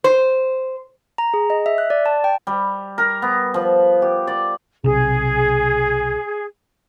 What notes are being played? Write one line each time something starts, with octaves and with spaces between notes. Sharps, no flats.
C5
A#5
G#4
D#5
E5
F#6
D5
A5
G5
G3
A#4
B3
F3
G4
D5
B1 C3 G#4